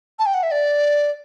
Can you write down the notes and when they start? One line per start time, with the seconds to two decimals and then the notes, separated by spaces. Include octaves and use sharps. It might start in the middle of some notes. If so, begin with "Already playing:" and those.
0.19 A5
0.26 G5
0.34 F#5
0.43 E5
0.51 D5